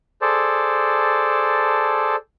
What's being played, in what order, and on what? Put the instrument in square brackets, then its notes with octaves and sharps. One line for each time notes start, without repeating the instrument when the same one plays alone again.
[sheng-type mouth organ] G#4 A4 C5 D5 A5